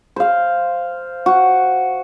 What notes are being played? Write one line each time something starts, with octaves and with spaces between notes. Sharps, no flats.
C5 F5
F#4